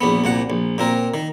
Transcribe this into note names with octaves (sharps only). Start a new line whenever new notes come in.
A#1 E2 B3
C2 A#2 F#5
A#1
A#2 C4 A#4
D#3